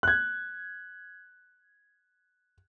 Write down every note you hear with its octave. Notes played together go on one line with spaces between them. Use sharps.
F#6 G#6